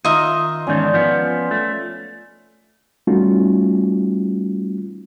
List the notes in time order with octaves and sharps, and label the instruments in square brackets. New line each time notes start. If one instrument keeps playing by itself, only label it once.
[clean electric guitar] D#3 [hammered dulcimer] D#4 F4 [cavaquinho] D#5 E5 A#5
[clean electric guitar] E2 G#2 D#3 [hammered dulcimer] C#4 D5 A5
[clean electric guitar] F3 B3
A3
[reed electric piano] G3 A3 C#4 D#4 F4 F#4